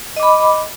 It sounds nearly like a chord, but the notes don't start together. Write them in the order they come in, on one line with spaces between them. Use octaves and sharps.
D#5 D6 B5